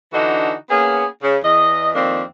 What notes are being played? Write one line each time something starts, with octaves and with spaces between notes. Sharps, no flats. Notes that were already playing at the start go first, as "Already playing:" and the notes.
D3 E3 D4 D#4 F#4
A#3 B3 C#4 G#4
C#3
E2 D#5
F2 D#3 A#3 C4 D4